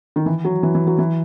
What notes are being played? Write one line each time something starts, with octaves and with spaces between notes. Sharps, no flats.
D#3
E3
F#3
E3
E3
F#3
E3